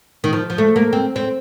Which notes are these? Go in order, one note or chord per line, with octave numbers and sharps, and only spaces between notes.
D#3
F3
F3
A3
A#3
C4
C4